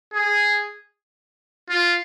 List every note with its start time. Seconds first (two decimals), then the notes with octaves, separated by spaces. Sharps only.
0.14 G#4
1.70 F4